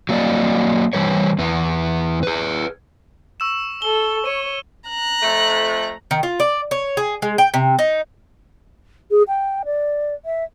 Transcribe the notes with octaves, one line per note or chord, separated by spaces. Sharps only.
F#3 A#3 D5 D#5
E3 G3 B4 C#5
E2 B3
G#4 B4
C#6 E6 E7
A4 G7
C#5 D#7
A#5 F#6
F2 A3
D#3
F4
D5
C#5
G#4
G#3
G5
C3
D#4
G#4
G5
D5
E5